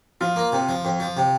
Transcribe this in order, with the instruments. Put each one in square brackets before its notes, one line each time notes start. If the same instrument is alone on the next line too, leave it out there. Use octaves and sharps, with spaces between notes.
[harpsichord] F3 [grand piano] F4
[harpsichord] A#3
C3
F3
F2
F3
C3